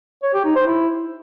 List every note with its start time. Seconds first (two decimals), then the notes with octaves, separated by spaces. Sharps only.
0.23 C#5
0.34 G4
0.45 D#4
0.55 C5
0.66 E4